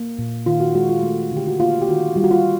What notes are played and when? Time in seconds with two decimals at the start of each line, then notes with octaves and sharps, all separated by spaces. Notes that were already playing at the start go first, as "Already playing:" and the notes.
Already playing: A#3
0.19 A#2
0.46 D#3 F4
0.60 F#4
0.75 G#3 F#4
0.89 F4
1.03 A3
1.32 D3
1.37 G4
1.48 F#4
1.59 A#3 F4
1.82 G4
1.88 D#3 F#4
2.16 G3 F4
2.24 F#4
2.31 F4